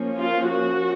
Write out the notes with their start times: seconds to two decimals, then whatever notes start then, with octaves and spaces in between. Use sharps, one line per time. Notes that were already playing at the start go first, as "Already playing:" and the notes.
Already playing: F3 A#3 C#4
0.21 F4
0.50 F#4